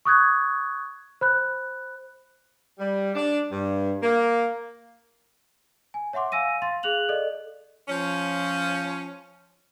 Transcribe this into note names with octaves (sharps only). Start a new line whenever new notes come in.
C#6 D#6 F#6 G#6
C5 B5 F#6
G3
D4
G2
A#3
G#5
C#5 E5 F#5 C6 D6
F5 G#5 E6 A#6 D#7
F5 C6 A6
G#4 F5 F#6 F7 F#7
A4 D5 D#5
F3 C#4